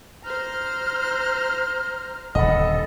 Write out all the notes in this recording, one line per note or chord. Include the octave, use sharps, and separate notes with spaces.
C5 A#5 F6
D#1 D3 A4 D#5 F#5 B5